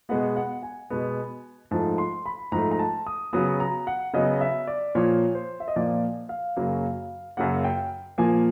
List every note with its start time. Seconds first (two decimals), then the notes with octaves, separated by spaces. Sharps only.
0.09 B2 G#3 B3 F#5
0.36 F#5
0.63 G#5
0.90 B2 G#3 B3
1.71 G#2 F3 A3 A5
1.98 C6
2.26 B5
2.52 G#2 F3 A3 A#5
2.71 A#5
2.79 A5
3.07 D#6
3.33 C#3 F#3 B3 D#6
3.60 A#5
3.87 F#5
4.14 C#3 F#3 B3 D#5
4.41 E5
4.67 D5
4.95 A#2 F3 A#3 C#5
5.35 C5
5.60 E5
5.68 D#5
5.76 A#2 F3 A#3 D5
6.29 F5
6.56 F#2 C#3 F#3 A#3
7.37 F#2 C#3 F#3 A#3 F#5
7.64 G5
8.18 A#2 F3 A#3 G#5